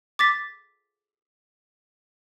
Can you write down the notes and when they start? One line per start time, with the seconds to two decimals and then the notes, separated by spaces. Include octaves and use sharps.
0.19 D6 A6 B6